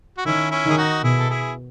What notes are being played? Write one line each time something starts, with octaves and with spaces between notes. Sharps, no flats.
F#4
D#3 C#4 E4
C#4 E4
D#3 G#4
D#4 F#4
B2 E4 G#4
A4
E4 G#4